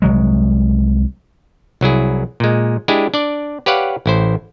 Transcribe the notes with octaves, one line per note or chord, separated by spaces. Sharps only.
C2 F#3 G#3
C2 F#3 E4 G#4
A#2 G#3
G#3 D4 E4 G4 G#4
D4 D5
G4 B4 C#5 D5 F5 F#5
A1 E4 C5